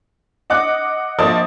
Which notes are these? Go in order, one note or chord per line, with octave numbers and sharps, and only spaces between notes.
D#5 F#5 D6 F#6
A#1 F3 D#5 A5 D#6